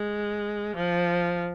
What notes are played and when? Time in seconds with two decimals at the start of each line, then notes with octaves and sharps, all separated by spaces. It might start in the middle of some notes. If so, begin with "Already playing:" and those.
Already playing: G#3
0.76 F3